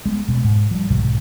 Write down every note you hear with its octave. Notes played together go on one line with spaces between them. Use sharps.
G#3 A#3 B3
B2 G#3
G#2
F3 G3
B1 G#2 C3 D#3